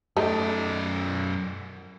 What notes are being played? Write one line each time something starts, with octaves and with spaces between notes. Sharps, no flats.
F#2 A3 D#4 D5